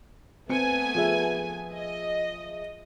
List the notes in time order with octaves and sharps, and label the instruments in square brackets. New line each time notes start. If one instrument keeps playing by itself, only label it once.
[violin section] A3 B3 G#5 [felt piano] C4 C#7
[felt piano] F3 G#4 E5
[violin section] D#5